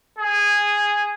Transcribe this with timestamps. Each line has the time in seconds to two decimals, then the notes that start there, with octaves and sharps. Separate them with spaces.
0.19 G#4